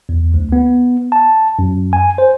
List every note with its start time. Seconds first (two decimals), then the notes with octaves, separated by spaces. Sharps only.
0.09 E2
0.34 D2
0.52 B3
1.12 A5
1.59 F#2
1.93 G#5
2.18 C5